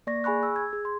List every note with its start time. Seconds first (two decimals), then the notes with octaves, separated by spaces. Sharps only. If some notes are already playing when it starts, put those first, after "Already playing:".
0.07 A#3 D5 C#6 A#6
0.24 G#4 G#5 B5 C#6 F#6
0.43 E6
0.56 G#6
0.73 G#4
0.85 C6